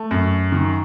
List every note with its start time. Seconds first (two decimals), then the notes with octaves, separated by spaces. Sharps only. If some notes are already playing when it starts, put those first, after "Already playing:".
Already playing: A3
0.11 F#2
0.52 D#3